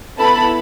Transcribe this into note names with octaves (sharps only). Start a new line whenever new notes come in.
B3 E4 A4 A5 B5